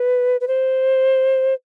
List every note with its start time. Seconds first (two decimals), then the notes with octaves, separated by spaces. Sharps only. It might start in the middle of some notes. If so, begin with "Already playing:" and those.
Already playing: B4
0.40 B4
0.47 C5